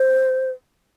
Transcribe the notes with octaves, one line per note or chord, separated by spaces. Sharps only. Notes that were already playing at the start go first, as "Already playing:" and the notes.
Already playing: C5